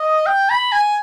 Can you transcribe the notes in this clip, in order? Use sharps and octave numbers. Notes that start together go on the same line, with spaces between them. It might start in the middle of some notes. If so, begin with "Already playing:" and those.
Already playing: D#5
G5
B5
G#5